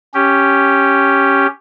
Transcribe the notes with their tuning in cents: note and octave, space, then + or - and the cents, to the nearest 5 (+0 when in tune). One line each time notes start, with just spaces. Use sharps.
C#4 +0 G4 +0